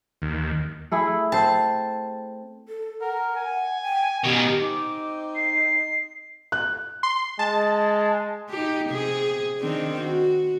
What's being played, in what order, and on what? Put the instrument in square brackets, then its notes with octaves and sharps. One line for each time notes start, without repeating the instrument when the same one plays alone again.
[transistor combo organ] D#2
[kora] A3 E4 G#4
[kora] C4 C5 [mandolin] A5
[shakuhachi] A4
[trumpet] A#4 [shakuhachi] F#5
[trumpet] G#5
[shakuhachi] G5
[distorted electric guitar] B2 D#3 [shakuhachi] G4
[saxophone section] C4 D#4 [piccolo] D6
[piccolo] C7
[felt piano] F#6
[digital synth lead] C6
[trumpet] G#3 [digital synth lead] A5
[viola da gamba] D#4 G4
C3 G#4
D#3 C4 D4
F#4